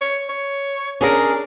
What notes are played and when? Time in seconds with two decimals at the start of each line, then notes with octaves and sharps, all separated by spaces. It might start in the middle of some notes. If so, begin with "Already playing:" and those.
0.01 C#5
0.29 C#5
1.01 C#4 D4 G#4 A#4